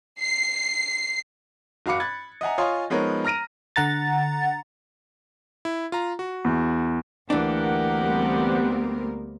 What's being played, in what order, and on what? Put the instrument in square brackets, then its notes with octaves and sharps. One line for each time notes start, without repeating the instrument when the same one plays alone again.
[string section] C7
[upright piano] F#1 F#4 F5 B5 D6 C#7
B5 F#6 G#6 A6
D#5 E5 F#5 G#5 A#5
F4 C#5 D#5 F5 G#5 C6
F3 G#3 B3 D#4 A#4 C#5
A#5 F6 A#6 D7 D#7
[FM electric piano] D3 F#5 A#5 A6
[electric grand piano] E4
F4 A#5
F#4
[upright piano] E2
[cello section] D2 A#3 A#4 [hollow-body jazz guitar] E3 D4 [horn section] G4 F#5
[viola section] G3 B3 C4